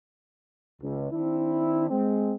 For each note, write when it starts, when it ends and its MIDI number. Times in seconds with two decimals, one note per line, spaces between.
0.82 1.08 37
1.12 1.89 51
1.12 1.89 60
1.12 1.89 62
1.12 1.89 64
1.90 2.34 56
1.90 2.34 60